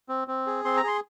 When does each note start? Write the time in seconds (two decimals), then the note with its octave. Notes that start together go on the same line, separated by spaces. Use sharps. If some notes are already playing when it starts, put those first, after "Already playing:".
0.09 C4
0.28 C4
0.47 G#4
0.65 C4 C6
0.77 A#5
0.83 G#4 C6